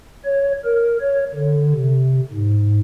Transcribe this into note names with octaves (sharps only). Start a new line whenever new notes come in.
C#5
A#4
C#5
D3
C3
G#2